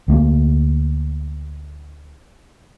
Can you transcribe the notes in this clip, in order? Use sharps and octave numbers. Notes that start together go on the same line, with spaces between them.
D2 A3 A#3